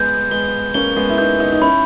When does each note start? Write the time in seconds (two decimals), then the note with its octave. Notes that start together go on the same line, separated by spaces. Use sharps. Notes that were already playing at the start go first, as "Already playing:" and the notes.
Already playing: G#3 B3 G6
0.31 G#3 B3 G7
0.74 A#3 C#4 G7
0.96 G#3 B3
1.10 E4
1.18 B3 D#4 G6
1.40 B3 D#4
1.52 D#4
1.61 C#4 E4 B5